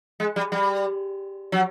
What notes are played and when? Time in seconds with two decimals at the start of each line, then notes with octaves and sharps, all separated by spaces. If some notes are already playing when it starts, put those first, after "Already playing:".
0.20 G#3
0.36 G3
0.52 G3
1.52 F#3